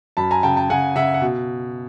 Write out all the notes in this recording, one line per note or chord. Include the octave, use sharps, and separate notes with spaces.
F#2 A5 B5
G#5 A#5
C#3 G5 A5
G5 A5
C#3 F#5 G#5
C#3 E5 F#5
F#5
B2